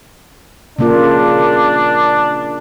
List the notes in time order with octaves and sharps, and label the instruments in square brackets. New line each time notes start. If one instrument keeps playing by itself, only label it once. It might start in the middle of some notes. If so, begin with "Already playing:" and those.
[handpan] C#3 A#3 F4 [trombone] D4